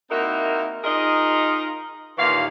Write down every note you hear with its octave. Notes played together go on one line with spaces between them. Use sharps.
A#3 C4 D#4 E4 F#4 A#4
D#4 F4 G#4 A#4 D#5
D#2 A#2 E3 C#5 F5